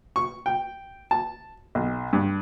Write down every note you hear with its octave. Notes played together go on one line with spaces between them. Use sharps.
C#6
G5
A5
B1
G2